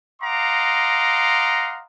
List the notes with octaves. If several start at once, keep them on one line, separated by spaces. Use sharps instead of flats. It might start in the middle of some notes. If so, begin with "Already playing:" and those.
D#5 F5 F#5 A#5 C6 D6